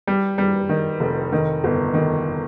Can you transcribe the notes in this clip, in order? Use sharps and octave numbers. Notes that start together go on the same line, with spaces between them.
G3
G3
D#3
F1
D#3
G1
D#3